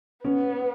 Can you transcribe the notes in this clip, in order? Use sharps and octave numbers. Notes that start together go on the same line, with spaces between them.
B3 C#4